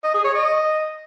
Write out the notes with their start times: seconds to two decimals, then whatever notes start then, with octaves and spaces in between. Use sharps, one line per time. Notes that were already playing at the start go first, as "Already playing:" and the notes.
0.04 D#5
0.14 G#4
0.24 C#5
0.35 D#5